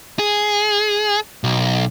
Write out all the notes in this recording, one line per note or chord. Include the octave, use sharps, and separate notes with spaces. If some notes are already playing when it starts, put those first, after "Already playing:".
G#4
B1